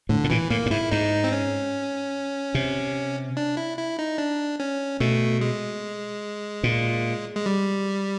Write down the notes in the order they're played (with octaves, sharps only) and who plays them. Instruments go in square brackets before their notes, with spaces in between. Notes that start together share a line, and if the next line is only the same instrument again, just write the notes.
[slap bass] A2 [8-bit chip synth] D3
[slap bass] A2
[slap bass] A#2 [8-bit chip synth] E3
[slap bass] A2 [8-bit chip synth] A#3
[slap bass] A2
[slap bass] G#2 [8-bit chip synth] E4
[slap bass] G#2 [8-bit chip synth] D#4
[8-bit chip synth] C4
C#4
[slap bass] C3
[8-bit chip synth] D4
E4
E4
D#4
D4
C#4
[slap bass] B2 [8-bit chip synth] A3
[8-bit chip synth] G#3
[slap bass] A#2
[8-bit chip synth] G#3
G3